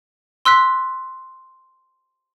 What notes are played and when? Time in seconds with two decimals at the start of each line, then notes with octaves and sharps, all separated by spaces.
0.45 C6 E6 F#6 B6